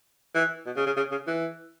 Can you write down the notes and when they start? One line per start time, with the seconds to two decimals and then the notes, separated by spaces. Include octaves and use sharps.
0.34 E3
0.66 B2
0.76 C#3
0.86 C#3
0.97 C#3
1.11 C#3
1.27 E3